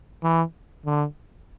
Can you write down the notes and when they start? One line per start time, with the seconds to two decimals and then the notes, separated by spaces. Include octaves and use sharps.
0.23 E3
0.86 D3